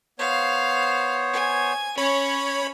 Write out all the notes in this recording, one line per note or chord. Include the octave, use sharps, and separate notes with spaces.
B3 C5 C#5 F5
G#5
C#4 C#5 B5